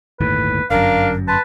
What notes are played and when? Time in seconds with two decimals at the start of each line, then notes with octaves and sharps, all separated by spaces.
0.20 G1 D#2 A2 B4
0.71 G1 F#2 D4 A#4 F5
1.28 B4 A5 C6